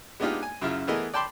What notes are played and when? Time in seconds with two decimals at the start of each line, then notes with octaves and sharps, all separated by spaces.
0.20 G#3 B3 D4 D#4 F4 G4
0.43 G#5
0.62 F#2 C#3 E4 F4
0.87 E3 A3 B3 G#4 A#4 D#5
1.14 D5 G5 A5 B5 C6 D6